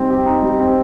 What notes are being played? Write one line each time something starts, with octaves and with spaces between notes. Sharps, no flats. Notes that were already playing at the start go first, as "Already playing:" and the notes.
Already playing: G3 C4 D#4
G4
D#4
G3
C4